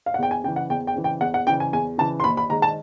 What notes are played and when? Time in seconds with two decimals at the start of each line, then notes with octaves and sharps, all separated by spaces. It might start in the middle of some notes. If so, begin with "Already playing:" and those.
0.06 F5
0.14 F#5
0.18 E2 G5
0.31 G#5
0.44 C#3 G5
0.48 E3
0.56 F#5
0.70 E2 G5
0.87 G5
0.96 C#3 E3
1.04 G5
1.21 E2 F#5
1.34 F#5
1.47 C#3 E3 G5
1.60 G#5
1.73 E2 G#5
1.98 C#3 E3 A5
2.20 C6
2.24 D#2 B5
2.37 B5
2.49 D#3 G#3 A#5
2.62 A5